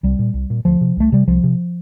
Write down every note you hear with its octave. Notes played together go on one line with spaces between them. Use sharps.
C2 G3
A#2
C2
A#2
D2 F3
C3
C2 A3
C3 G3
C2 F3
C3